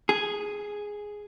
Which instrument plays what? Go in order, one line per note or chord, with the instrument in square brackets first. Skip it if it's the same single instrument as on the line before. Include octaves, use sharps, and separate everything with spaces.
[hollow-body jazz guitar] G#4